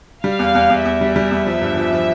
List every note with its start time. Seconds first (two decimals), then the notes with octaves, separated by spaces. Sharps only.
0.24 G3 F5
0.39 E2
0.55 E2
0.70 E2
0.85 E2 E5
1.01 G3
1.16 G3
1.31 E2
1.46 F3
1.62 G2
1.77 F3
1.93 F3